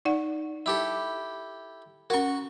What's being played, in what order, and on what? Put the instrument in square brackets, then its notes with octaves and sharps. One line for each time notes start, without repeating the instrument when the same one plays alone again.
[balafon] D#4 D5 F#5
[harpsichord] E4 G4 A4
[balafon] C#4 A#4 [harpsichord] F#4 C#6